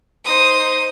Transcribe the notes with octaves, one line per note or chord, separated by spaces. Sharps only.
D#4 C5 D#6